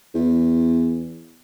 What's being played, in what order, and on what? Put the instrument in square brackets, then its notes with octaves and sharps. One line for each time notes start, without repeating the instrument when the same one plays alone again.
[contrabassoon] E2